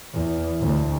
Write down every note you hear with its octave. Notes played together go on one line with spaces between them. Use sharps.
E2
D2